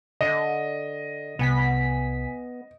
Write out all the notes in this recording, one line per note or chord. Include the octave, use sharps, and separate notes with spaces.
D3 D#5
C2 B3 G#5 B6